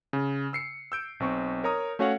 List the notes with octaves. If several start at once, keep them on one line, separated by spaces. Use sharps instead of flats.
C#3
E6 C7 C#7
E6 G6 D7
B1 C4 C#6
A#4 C#5 A#5 D#6
A3 C#4 F#4 C#5 F5 F#5